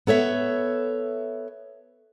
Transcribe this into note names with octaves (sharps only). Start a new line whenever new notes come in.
B3 A4 C#5 E5